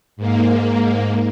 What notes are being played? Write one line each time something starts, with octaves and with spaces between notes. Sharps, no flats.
G#2 A#3